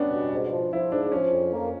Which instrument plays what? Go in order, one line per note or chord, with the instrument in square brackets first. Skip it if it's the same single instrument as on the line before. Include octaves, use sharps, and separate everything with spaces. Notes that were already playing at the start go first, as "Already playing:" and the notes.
Already playing: [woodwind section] G3 [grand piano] B3 C#4 D4
[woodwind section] B2
G#2
F3
[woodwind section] F3 [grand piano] E4
[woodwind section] G#2 [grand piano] D4
[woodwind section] F3 [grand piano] C#4
[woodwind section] F2
A#3